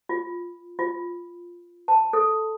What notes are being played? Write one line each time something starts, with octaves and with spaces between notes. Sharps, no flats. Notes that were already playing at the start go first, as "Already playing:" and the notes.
F4
F4
A5
A4